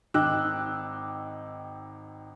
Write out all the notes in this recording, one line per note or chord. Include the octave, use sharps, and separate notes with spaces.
G#1 D#4 G5 D6 E6 F#6